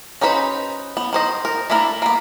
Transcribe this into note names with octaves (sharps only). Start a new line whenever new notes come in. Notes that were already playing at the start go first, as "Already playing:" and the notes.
C#4 D#4 F#4 B4 C5
B3
D#3 C5 D#5
A#4
A3 D4 E4 A#4
A#3 B3